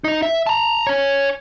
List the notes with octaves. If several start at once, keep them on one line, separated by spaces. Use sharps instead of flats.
D#4 D#5
E5
A5 A#5
C#5 G#5